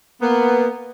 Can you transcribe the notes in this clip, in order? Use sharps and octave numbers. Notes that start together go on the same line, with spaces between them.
A#3 B3